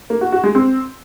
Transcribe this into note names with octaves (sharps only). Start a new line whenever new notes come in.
A#3
F#4
F#4
G#3
C4